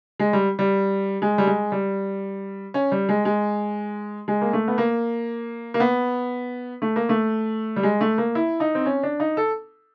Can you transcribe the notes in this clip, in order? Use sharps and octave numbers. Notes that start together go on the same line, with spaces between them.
G#3
G3
G3
G#3
G3
G#3
G3
C#4
G3
G#3
G#3
G#3
A#3
A3
B3
A#3
A#3
B3
A3
A#3
A3
G3
G#3
A3
A#3
E4
D#4
C4
C#4
D4
D#4
A4